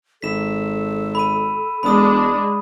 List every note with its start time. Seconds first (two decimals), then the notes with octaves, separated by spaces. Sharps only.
0.22 G#1 A4 B6 E7
1.15 B5 D#7
1.83 E1 G#3 D4 B5 D#6